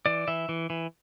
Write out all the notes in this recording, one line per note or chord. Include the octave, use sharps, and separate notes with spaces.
E3 D5
E3 E5
E3
E3